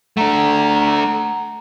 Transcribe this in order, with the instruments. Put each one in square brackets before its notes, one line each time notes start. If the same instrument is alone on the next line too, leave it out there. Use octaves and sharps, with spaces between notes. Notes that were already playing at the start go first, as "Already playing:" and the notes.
[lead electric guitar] A3 D4 [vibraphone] F#5 A#5